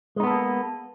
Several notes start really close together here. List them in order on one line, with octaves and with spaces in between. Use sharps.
G#3 D#4 B3 A4 A#3